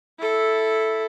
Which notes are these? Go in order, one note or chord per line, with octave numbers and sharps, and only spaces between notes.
E4 A4